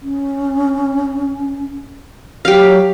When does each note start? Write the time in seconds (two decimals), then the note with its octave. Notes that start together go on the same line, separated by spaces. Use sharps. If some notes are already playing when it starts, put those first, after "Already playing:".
0.02 C#4
2.45 F#3 G4 F5